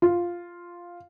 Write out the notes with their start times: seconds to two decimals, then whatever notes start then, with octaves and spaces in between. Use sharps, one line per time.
0.02 F4